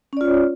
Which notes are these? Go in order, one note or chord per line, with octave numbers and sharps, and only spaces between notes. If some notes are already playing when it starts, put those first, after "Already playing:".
C#4 F4 C#5 D5